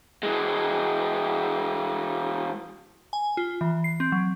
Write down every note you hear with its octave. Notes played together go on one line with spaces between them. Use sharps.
E3 G#3
G#5
F4
E3
C7
C4
F#3